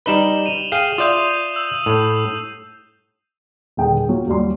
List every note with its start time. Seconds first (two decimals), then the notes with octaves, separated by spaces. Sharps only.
0.06 G3 D#4 B4 E7 F#7 G7
0.46 D#7 F7
0.72 G#4 F5 G5 C7 D#7
0.98 F4 D5 E5 D#6 G6
1.56 E6
1.86 A2
3.77 D#1 D3 G#4 G5
4.08 F#3 F4 C#5
4.26 D#2 F#3 G3 C6